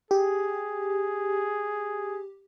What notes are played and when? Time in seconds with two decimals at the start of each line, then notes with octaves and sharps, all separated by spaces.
0.11 G4 G#4